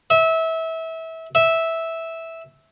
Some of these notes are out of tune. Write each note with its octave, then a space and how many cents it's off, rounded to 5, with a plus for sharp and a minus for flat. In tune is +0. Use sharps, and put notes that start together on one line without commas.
E5 -25
E5 -10